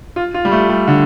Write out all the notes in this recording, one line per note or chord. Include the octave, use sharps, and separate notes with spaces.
F4
F4
G3
A3
G3
D3